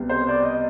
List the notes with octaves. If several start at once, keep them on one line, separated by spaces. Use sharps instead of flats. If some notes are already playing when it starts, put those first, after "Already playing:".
Already playing: C2 B2 G3 B3
C5
D5
D#5